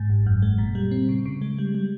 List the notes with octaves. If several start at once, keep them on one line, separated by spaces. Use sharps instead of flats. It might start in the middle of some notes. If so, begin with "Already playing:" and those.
Already playing: G#2
G1
F#2
G#3
A#2
G3
C4
C#3
C#3
G#3
G3
G3